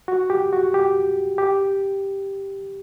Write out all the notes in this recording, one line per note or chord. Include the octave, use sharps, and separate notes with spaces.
F#4
G4
F#4
G4
G4